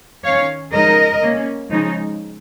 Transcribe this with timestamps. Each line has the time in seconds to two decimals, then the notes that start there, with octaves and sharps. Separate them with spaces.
0.24 D#3 C#4 C#5 F5
0.73 C#3 F3 G#3 D#4 A#4 D#5
1.22 C#3 A#3 C#4
1.70 C#3 F3 G#3 D#4